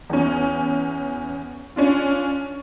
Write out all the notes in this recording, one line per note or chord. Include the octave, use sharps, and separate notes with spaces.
E2 C#4
C#4 D4 F4